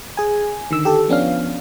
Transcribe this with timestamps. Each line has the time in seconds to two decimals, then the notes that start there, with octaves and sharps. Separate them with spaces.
0.17 G#4 G#5
0.71 D3 D#3 E6
0.85 G4 A4
1.08 F3 B3 C#4 D4 F5